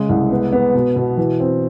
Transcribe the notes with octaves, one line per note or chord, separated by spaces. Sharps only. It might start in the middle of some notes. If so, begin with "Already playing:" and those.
Already playing: C#3 G#3
C2
B3
B3
B2
B2
E3
C4